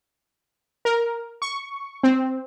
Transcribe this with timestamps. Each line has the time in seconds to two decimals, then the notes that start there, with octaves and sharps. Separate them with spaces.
0.85 A#4
1.42 C#6
2.03 C4